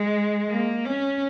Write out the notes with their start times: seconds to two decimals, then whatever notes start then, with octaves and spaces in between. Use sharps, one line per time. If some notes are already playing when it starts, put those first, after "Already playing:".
Already playing: G#3
0.50 A#3
0.85 C#4